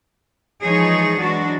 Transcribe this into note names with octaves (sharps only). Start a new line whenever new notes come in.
E3 F3 G#3 D#4 G#4 C#5
E3 F#3 G#3 D4 F#4